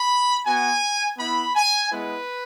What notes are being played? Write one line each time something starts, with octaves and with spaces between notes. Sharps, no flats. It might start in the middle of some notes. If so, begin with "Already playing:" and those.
Already playing: B5
B3 F#4 G#5
B3 E4 B5
G#5
G#3 B3 E4 B4